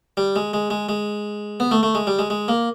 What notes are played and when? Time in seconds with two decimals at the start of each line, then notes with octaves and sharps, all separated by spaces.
0.17 G3
0.36 G#3
0.53 G#3
0.70 G#3
0.89 G#3
1.60 B3
1.71 A3
1.83 A3
1.95 G#3
2.07 G3
2.19 G#3
2.30 G#3
2.48 A#3